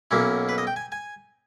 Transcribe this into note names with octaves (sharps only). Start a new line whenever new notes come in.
B1 B2 A#3 C#4 E4
B4
D#5
G5
G#5
G#5